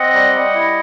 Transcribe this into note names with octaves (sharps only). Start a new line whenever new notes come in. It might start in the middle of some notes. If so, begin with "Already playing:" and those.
Already playing: C4 D#5 F#5
G3
G3
E4